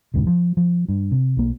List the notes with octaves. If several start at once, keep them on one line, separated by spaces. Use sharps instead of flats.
E1 D2 G#2 C#3
F3
F3
G2
C3
B1 A#3